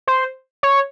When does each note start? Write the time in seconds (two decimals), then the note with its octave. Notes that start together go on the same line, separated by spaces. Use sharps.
0.07 C5
0.63 C#5